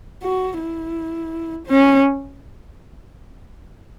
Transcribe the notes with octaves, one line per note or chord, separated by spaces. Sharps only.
F#4
E4
C#4